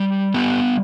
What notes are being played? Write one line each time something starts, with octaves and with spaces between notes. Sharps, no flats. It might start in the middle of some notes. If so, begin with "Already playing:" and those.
Already playing: G3
B3 G4